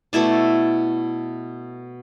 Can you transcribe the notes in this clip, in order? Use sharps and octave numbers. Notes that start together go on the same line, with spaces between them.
B2 A3 E4 D5